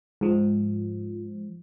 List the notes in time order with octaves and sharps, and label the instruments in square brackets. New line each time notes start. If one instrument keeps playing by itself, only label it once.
[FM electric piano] G#2 F3